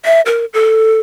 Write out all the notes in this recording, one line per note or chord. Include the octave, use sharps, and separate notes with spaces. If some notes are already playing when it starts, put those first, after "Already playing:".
E5
A#4
A4